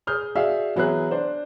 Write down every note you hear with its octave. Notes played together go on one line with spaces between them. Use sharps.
G#4 D#6 F6 G6
F#4 G#4 D5 E5 F5
E3 F#3 B3 G#4 E5 F#6
D4 C5